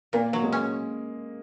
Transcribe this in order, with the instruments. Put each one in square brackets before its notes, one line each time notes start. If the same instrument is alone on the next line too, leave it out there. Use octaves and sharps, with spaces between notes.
[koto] A#2 [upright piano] A#3
[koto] F#3
[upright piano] G#3
[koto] C#4